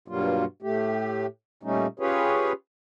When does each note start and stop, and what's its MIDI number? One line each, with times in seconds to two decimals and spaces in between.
0.08 0.45 43
0.08 0.45 47
0.08 0.45 54
0.08 0.45 55
0.08 0.45 58
0.08 0.45 65
0.62 1.26 45
0.62 1.26 57
0.62 1.26 67
1.63 1.87 46
1.63 1.87 55
1.63 1.87 57
1.63 1.87 61
1.63 1.87 63
2.00 2.52 61
2.00 2.52 65
2.00 2.52 67
2.00 2.52 68
2.00 2.52 71
2.00 2.52 73